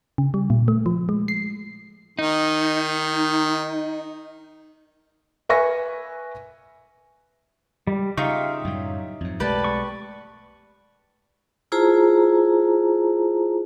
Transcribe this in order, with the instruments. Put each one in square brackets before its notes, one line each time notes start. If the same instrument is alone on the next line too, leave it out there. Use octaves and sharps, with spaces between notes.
[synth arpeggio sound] C#3
G3
A#2
A3
F3
G#3
C7
[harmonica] D#3 [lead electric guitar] D#4
[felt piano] B4 E5 G#5 C#6 A#6
[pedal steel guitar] G3 [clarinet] G#3
[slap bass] C#3 [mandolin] D#4 F4 G4 [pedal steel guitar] E5 C#6 [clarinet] F5
[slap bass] F#2 A2 G3 [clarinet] F#3
[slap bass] F2 G#2 [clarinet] F#3
[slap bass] B1 G#3 A3 [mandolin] G4 B4 A5 [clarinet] D5
[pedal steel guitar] C#6
[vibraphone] E4 F4 G#4 C5 A5 A#5